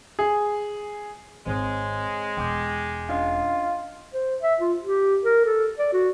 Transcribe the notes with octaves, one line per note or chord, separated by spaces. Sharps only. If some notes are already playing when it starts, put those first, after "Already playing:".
G#4
G#1 G#3 C4 C5 C#5
E1 G5 D6 G6
C#4 D4 F4 D#5
C5
E5
F4
G4
A#4
A4
D5
F#4